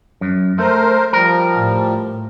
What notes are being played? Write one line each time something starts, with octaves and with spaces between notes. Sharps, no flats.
F#2
A3 A#4 C5
F3 G3 A#4
A2